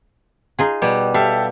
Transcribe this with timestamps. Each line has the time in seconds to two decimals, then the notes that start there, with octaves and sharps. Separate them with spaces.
0.59 D#4 F4 G#4
0.82 B2 G3
1.14 G4 A4 E5 F5